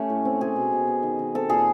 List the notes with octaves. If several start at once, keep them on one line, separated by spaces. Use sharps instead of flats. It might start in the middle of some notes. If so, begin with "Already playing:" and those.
Already playing: A3 C#4 G4
A2
C4
C4 G#4
B2
B2
B3
D#3
D#3
C4 A4
A#2 G#4